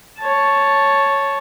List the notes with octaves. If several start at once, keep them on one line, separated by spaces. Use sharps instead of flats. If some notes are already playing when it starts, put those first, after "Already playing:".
C#5 A5